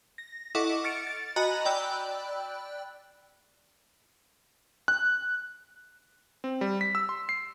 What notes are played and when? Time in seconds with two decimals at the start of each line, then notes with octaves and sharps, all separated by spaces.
0.18 A#6
0.55 E4 A4 D#5 F#5 C#6 D6
0.84 F6 A6 C#7 D7
1.07 A6
1.36 F#4 D#5 G#5 A#5 B5 F#6
1.65 D5 G5 B5 E6 F#6
4.88 F#6
6.44 C4
6.61 G3
6.81 B6
6.95 E6
7.09 C6
7.29 C7